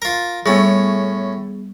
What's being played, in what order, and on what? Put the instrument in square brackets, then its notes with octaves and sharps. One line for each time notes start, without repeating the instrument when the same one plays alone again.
[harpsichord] F4 A#4
[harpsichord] A2 C#4 [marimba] G3 [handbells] B3 G#4